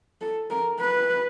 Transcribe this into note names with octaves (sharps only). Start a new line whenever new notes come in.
A4
A#4
B4